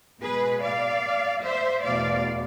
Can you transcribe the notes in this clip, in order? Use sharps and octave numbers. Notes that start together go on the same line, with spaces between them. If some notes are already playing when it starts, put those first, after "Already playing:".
B2 G#3 G#4 B4
D5 F5
C5 E5
E2 B2 A3 D5 F5